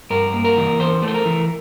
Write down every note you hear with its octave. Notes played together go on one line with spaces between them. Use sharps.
G2 A#4
A#3
A#4
E3
E2 C5
A3
C5
A#4
E3